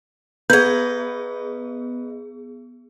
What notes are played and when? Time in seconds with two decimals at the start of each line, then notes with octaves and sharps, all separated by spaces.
0.50 B3 G#4 B4 D#5 G6 G#6